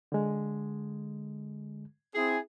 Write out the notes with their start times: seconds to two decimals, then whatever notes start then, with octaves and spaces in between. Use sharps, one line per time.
0.12 D3 G#3
2.15 C4 E4 G#4